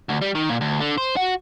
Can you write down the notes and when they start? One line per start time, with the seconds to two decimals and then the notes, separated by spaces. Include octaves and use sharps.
0.09 D2
0.22 G3
0.35 D#3
0.49 A#2
0.61 D2
0.80 D3
0.98 C5
1.16 F#4